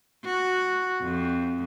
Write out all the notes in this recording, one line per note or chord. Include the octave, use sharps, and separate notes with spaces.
F#4
F2